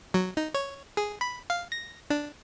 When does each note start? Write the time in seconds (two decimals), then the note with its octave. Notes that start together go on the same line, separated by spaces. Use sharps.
0.14 F#3
0.37 D#4
0.54 C#5
0.97 G#4
1.21 B5
1.50 F5
1.72 A#6
2.10 D4